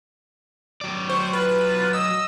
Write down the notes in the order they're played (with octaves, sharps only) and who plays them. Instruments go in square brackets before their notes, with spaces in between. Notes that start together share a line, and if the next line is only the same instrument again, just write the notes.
[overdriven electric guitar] F#3 D5
[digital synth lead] C5 [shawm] C#6
[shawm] F4 [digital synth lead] B4
[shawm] D#5 [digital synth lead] E6